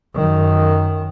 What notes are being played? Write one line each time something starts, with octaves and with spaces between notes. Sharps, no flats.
F#2 D#3